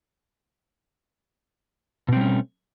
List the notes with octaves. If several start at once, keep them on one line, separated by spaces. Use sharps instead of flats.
B2 G3 A3 C4 C#4